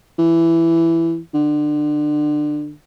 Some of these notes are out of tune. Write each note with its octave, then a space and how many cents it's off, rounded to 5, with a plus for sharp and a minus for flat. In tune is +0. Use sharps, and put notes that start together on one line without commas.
E3 +10
D3 +25